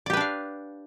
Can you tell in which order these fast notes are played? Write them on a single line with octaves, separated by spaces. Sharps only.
D5 G4 B4 D4 F5